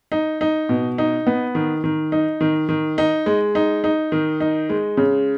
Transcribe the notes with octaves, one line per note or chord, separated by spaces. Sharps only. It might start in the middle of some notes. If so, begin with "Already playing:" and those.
D#4
D#4
B2
D#4
B3
D#3
D#3
D#4
D#3
D#3
D#4
G#3
D#4
D#4
D#3
D#4
G#3
C#3